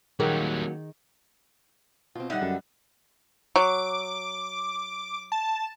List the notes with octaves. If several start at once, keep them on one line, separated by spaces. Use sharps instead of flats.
D#3 F#3 G3 A#3 C#4 G#4
B2 C4 F4
D3 G3 D#4 D#5 E5 F#5
F#2 A4
F#3 D6
A5